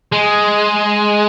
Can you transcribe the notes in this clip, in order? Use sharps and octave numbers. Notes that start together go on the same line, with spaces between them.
G#3